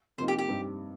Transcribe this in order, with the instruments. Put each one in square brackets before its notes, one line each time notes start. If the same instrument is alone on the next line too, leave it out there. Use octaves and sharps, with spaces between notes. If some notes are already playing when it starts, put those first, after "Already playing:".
[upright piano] F2 C3 F3 A#3 D#4 [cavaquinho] C5
[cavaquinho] G4
G4
[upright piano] G2 G3 C4 D#4